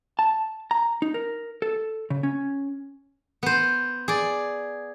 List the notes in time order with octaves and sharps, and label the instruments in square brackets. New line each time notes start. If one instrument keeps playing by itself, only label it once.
[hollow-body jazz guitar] A5
A#5
D#4
A#4
A4
C#3
C#4
[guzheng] B3 C5
G#4 D5